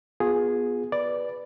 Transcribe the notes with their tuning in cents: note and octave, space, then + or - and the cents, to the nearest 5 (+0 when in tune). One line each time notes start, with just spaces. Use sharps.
B3 +0 F4 +35 G#4 +0
B4 +0 D5 +0